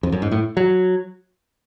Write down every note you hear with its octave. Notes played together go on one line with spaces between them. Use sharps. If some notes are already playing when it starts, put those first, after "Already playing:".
F2
F#2
G#2
A2
F#3